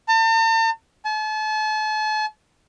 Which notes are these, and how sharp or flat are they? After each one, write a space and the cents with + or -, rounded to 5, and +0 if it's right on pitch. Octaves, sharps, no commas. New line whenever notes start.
A5 +45
A5 -40